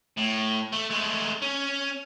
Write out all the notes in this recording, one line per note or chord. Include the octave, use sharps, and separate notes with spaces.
A2
A3
G#3 A3
C#4